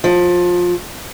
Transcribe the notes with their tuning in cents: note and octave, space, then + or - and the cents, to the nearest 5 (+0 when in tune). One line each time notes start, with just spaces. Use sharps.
F3 +20